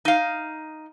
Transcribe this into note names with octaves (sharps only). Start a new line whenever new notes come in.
D#4 F5